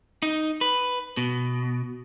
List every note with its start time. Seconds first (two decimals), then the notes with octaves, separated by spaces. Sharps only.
0.23 D#4
0.61 B4
1.17 B2